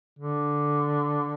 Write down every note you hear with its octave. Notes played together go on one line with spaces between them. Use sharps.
D3